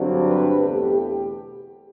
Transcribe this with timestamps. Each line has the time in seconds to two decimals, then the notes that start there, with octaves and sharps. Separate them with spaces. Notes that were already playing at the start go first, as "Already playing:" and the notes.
Already playing: G2 D3 F#3 C4
0.26 B4
0.60 E2 B2 A3 G4
0.96 G4